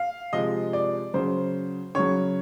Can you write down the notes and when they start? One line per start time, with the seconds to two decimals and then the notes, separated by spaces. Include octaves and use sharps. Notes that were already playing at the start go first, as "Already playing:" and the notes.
Already playing: F5
0.33 C3 F3 G#3 D#5
0.73 D5
1.14 C#3 F#3 C5
1.95 C#3 F#3 C#5